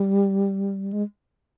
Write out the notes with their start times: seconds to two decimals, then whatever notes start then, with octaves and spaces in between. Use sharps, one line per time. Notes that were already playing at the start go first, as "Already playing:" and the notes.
Already playing: G3
0.93 G#3